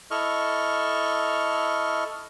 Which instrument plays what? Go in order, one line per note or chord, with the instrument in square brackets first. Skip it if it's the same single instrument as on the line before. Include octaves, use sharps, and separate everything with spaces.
[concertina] E4 A4 D#5 C#6 F6